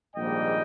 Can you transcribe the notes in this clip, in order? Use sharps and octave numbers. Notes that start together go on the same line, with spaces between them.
A#1 G#2 D#3 G3 A#3 D#5 G5